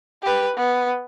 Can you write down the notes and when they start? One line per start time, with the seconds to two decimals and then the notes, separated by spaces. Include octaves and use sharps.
0.23 G4 B4
0.56 B3